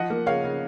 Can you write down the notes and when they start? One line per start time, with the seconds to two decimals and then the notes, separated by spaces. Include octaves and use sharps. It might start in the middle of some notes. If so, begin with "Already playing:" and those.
Already playing: F3 D#5 F#5
0.10 A#3
0.26 C#3 C#5 F5
0.44 C#3